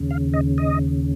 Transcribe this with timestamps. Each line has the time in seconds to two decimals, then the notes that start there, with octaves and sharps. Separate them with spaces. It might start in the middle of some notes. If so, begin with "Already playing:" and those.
Already playing: D#2 C#3
0.11 F5
0.34 D#5
0.58 D#5